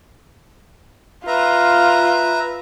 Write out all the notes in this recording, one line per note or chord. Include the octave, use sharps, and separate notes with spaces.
F4 B4 E5 A#5